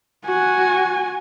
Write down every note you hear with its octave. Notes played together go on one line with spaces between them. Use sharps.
F#4 G#5